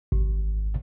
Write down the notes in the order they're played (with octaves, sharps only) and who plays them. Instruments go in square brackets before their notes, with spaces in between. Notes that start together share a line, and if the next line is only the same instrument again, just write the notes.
[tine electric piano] G#1